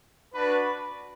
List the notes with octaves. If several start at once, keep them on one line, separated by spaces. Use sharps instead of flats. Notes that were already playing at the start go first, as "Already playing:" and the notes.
D4 F#4 B4